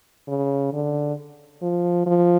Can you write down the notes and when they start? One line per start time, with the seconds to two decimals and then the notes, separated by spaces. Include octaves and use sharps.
0.28 C#3
0.73 D3
1.62 F3
2.06 F3